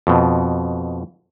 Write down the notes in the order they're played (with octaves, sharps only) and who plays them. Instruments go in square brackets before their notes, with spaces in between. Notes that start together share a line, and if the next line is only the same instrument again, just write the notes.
[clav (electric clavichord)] F2 B2